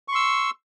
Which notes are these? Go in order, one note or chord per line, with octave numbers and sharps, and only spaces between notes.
C6 C#6 E6